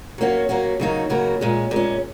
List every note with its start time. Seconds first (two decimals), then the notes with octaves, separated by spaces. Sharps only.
0.18 F#3 A#3 C#4 F#4
0.49 F#3 A#3 C#4 F#4
0.80 C#3 F#3 A#3 D#4 F#4
1.10 C#3 F#3 A#3 D#4 F#4
1.41 A#2 G#3 C#4
1.71 A#2 G#3 C#4